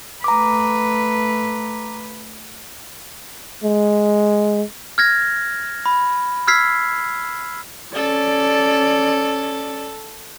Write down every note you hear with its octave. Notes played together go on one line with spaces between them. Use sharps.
A3 B4 A#5 D6
G#3
F6 G#6 A#6
B5
E6 F6 G#6 B6 C7
C#4 A4 D5